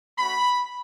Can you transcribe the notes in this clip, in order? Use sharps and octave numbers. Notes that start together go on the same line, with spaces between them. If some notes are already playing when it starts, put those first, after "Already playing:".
A3 C#4 F#4 B5